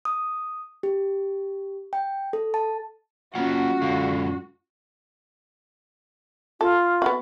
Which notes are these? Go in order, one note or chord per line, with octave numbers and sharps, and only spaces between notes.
D#6
G4
G5
A4
A5
F#3 A#3 C#4 F4 F#4 F#5
F#2 D3 G#3 F5
F4 A4
B3 F#4